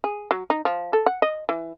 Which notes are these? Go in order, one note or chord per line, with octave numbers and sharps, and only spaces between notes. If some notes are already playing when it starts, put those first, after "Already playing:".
G#4
F#3
D#4
F3
A4
F#5
D#5
E3